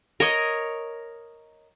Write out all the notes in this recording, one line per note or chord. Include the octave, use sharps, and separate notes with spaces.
A#4 C#5 D#5